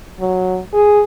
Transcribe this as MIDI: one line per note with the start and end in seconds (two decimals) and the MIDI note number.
0.21 0.59 54
0.73 1.02 68